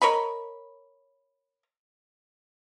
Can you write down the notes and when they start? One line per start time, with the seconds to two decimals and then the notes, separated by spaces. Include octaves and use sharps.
0.02 A#4 C#5 D#5 B5